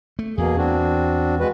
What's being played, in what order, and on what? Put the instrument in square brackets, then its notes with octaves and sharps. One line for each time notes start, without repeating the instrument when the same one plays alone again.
[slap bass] A3
[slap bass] E2 [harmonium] B2 A#3 G#4
[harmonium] C4 D4 F#4
G#3 F#4 B4